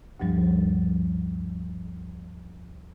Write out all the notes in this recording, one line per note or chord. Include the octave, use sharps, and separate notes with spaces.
D2 G2 F3 G3